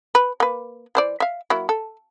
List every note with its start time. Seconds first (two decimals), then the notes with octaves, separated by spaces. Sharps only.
0.15 B4
0.40 A#3 B4
0.95 E3 C5 D5
1.20 E5 F5
1.50 F#3 A#3 E4
1.69 A4